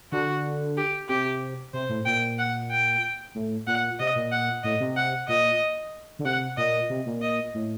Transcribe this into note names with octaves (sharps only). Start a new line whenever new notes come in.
D3 F#4
G4
C3 G4
C3 C5
A2
A#2 G5
F#5
G5
A2
A#2 F#5
C3 D#5
A#2
F#5
A2 D#5
C3
F#5
A#2 D#5
D3
C3 F#5
A#2 D#5
C3
A#2
D#5
A2